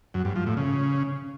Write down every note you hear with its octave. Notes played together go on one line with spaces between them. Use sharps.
F#2
G2
F3
A2
C#3